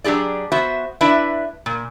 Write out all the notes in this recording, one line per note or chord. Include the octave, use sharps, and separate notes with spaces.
F#3 D4 G4 G#4 D5
B3 F#4 C5 E5
D4 E4 B4 D5 E5
A#2